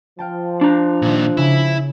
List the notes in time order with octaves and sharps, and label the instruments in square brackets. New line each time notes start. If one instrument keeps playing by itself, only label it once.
[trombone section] F3 [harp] F5 G5 A5
[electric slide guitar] D4 A#5
[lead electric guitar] A#2 D#3
[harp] C#3 [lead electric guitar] E4